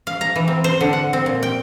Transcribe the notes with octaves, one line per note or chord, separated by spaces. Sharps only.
F5
A#5
E3
C4
C5
D3
F#5
C4
A#2
G5